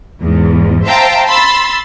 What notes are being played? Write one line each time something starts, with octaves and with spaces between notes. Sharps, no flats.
E2 G#2
C5 E5 F5 G5 A5 A#5
B5 C6 E6 A6